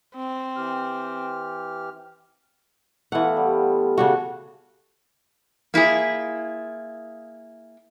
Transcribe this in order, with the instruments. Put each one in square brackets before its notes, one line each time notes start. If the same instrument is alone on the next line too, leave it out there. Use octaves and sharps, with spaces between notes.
[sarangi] C4
[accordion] E3 G4 F6
[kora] E3 F#5 [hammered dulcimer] A3 B3 F4
[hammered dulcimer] G3
[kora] C#3 D4 F#4
[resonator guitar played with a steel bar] A#3 E4 F4 G#4